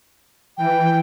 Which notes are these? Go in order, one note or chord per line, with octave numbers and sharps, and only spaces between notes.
E3 G5